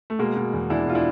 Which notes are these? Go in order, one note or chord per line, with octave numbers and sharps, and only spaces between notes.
A3
B2 G#3 A#3
B2
E2
E2 D4 E4
B2 F4
D4 E4